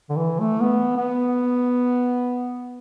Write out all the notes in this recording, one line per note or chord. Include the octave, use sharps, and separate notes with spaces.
D3
E3
A3
B3
B3